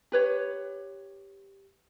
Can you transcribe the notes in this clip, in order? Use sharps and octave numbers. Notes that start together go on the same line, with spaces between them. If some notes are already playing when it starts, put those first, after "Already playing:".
G4 B4 C#5